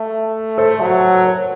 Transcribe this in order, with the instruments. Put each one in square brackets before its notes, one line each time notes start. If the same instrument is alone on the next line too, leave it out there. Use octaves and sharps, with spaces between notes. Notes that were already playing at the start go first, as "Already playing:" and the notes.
Already playing: [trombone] A3
[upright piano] A4 C5
[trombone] F#3
[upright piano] C5
A#4 C#5